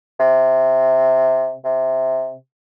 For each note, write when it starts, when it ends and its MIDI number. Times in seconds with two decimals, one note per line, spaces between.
0.20 1.55 48
1.65 2.35 48